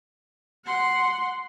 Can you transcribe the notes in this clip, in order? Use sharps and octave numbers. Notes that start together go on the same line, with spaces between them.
F#5 C6